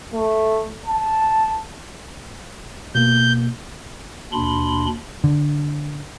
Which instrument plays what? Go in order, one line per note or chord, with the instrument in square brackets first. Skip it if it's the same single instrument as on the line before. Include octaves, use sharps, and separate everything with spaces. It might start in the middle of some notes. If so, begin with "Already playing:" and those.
[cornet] A3
A5
[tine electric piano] B2 A#3 [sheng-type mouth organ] G6
[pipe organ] D#2 B2 D4 B5 C6
[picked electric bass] D3